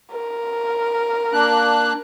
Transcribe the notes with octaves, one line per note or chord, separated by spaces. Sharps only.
A#4
A#3 D4 F#6